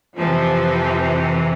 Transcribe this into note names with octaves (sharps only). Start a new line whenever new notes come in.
F2 C3 E3 F3